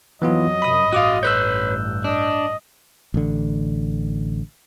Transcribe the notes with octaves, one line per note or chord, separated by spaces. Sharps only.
F2 E3 F#3 B3 F4 D#5
F#2 C3 B5 D#6
A1 G2 F#4 F5 D6 D#6
B4 C#5 E6 F#6 G6
D4 D#5
A1 D3